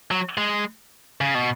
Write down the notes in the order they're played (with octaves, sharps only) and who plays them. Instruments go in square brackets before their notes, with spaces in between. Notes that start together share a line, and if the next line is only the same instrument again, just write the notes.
[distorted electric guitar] F#3
G#3
C#3
B2